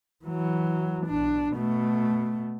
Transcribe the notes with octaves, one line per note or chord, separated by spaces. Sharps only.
E3 F#3
B1 D4
B2 A3